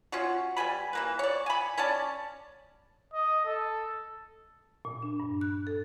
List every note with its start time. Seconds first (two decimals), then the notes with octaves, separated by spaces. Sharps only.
0.12 C#4 F4 F#4
0.57 G3 B4 G#5 B5
0.93 E3 A#3 B4
1.19 C#5 D5
1.46 G#5 B5
1.77 C#4 C#5 D5 A5
3.13 D#5
3.45 A4
4.85 A#2
5.03 D4
5.20 G2
5.41 F#6
5.67 A4